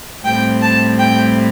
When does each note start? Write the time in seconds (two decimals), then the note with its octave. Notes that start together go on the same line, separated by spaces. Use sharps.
0.24 A2 G3 C4 G5
0.61 A5
0.98 G5